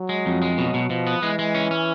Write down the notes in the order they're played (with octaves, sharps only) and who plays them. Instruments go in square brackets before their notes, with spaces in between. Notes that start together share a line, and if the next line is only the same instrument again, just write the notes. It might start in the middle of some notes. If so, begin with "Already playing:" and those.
Already playing: [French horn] F#3
[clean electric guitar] G#3
F2
G#3
[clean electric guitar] B2 [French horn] F#3
[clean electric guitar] B2
[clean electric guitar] B2 [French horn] F3
[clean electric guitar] B3
[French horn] E3 [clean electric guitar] G#3
[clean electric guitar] G#3
C#4
C#4